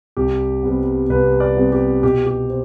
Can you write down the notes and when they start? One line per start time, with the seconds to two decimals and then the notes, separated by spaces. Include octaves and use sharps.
0.17 C2 G4
0.63 C3 G3 B3
1.10 C2 B4
1.40 D5
1.56 C3 G3 B3
1.72 G4
2.03 B2 G4
2.26 G4
2.49 C4